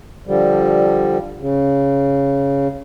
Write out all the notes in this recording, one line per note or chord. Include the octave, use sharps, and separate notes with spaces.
D3 F3 G3
C#3